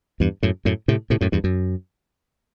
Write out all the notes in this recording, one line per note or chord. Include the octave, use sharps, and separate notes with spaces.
E2 G2
F#2 A2
F#2 A2
A2 C3
A2 C3
F#2 A2
E2 G2
F#2